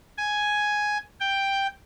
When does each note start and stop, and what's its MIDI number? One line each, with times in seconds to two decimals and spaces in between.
0.18 0.98 80
1.21 1.67 79